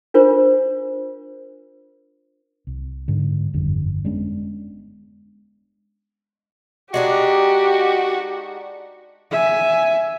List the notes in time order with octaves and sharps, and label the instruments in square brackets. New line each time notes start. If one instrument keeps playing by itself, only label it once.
[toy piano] D4 F4 A#4 C5
[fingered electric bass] C2
G#2 D3
G1 F2 D3 G3
G#3 B3 C#4 D4
[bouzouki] G#3 D4 D#4 [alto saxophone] F#4 [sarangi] G4
[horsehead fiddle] E5 G#5